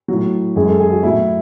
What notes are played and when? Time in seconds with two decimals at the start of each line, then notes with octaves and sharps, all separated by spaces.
0.08 A2 F#3
0.56 F#2 D#3 G#3 G#4
0.68 A4
0.80 G#4
0.92 F#4
1.03 A2 F#3 E4